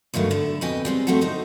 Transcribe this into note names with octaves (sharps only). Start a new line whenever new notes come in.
D2 G2 D#3 F#3 A3
D3 E4
F2 B2 B4 D#5 G5 G#5
G3 G#3 C4
G2 G3 A3 C4 F#4 A4
D2 D#4 C5